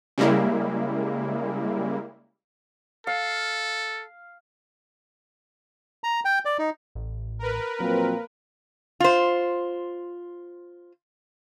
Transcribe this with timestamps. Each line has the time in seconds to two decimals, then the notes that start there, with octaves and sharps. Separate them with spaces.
0.18 C#3 G3 G#3 A#3 E4
3.07 A4 F5
6.04 A#5
6.25 G5
6.45 D5
6.59 D#4
6.95 A1
7.39 A#4 B4
7.80 A#2 F3 F#3 A#3 C4
9.00 F4 C5